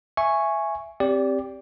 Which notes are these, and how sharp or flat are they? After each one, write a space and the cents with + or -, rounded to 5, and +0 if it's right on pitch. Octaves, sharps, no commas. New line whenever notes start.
E5 +15 G#5 +0 C#6 -5
C4 +5 G4 +10 D5 -25